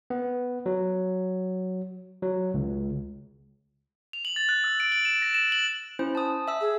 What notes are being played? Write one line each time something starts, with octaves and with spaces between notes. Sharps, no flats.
B3
F#3
F#3
C#2
F7
F#7
A6
F#6
E6
D7
F#7
E7
A#6
E7
F#7
C#4 E4 C5
A5 D#6
E5 E6
G#4